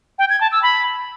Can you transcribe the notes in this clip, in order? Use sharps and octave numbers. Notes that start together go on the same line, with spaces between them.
G5
G#6
A5
E6
B5